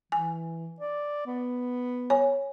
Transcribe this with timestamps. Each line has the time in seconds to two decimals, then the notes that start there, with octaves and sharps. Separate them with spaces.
0.12 E3 G#5
0.80 D5
1.26 B3
2.10 C#5 G#5